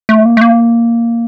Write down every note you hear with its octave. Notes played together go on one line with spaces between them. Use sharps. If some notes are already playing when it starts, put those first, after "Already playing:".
A3
A#3
A3
A#3